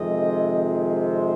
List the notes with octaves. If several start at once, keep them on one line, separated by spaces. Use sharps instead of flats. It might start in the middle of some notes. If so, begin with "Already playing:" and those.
Already playing: F2 C3 D#3 G#3 D#5
C5